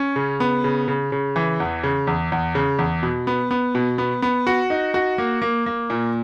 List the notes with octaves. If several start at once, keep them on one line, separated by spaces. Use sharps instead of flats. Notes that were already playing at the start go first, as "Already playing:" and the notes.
Already playing: C#4
C#3
B3
C#3
C#3
C#3
E3
E2
C#3
E2
E2
C#3
E2
B2
B3
B3
B2
B3
B3
F#4
D#4
F#4
A#3
A#3
A#3
A#2